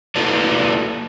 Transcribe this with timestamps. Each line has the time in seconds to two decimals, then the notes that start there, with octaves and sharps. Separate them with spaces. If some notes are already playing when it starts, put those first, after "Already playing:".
0.16 A#3 E4 F#4 A4 B4 D5